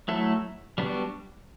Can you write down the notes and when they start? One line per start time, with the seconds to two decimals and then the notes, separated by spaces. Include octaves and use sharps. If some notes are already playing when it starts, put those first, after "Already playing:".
0.08 F#3 A3 E4 A4
0.78 G3 B3 D4 F#4